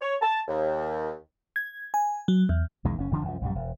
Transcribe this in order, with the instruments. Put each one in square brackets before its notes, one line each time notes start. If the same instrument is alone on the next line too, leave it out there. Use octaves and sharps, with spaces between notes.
[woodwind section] C#5
A5
D#2
[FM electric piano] G#6
G#5
F#3
E2
[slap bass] B1 E2 D#3 G#3
F#1 C#4
D#1 D3 F3 D4
C2 F#2 F3
A#1 F#2 G3
E1